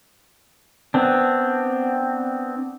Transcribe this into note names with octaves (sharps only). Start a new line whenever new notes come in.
B3 C4 D4